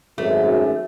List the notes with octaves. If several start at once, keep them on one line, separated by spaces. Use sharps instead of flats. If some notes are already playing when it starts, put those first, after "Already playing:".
G#1 F#2 A3